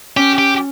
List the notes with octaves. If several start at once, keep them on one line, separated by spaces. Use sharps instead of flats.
C#4 G4
G4